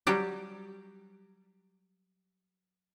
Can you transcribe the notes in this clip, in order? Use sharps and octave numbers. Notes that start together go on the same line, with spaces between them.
F#3 G3 G4